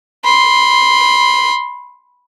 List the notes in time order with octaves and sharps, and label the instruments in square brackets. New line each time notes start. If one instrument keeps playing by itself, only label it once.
[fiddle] B5 C6